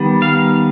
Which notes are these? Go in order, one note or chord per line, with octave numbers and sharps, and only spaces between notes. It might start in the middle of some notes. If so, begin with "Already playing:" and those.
Already playing: D#3 G3 B3
F5